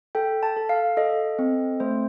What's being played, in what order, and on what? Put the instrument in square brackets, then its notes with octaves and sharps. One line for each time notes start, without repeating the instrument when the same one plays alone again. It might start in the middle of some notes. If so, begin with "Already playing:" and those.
[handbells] A4 G5
A5
A4
F5
A4 D#5
C4
A3 C5